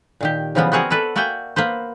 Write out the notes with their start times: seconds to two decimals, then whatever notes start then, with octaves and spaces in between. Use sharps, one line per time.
0.21 A#2 D#3 G4
0.55 C#3 E3 F3 G3 A#3 B3
0.72 B3 C4 F#4 G#4 A#4 F#5
0.90 A4 B4 D5 E5
1.16 A#3 F#4 D5 E5 G5 G#5
1.56 A#3 B3 B4 C5